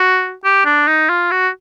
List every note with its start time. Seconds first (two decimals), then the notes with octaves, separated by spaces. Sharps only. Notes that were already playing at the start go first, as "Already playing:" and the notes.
Already playing: F#4
0.45 G4
0.65 D4
0.87 D#4
1.09 F4
1.31 F#4